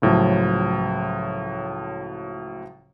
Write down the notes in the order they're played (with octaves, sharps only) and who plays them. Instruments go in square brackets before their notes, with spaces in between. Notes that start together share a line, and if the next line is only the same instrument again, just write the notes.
[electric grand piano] C#2 A2 F3 F#3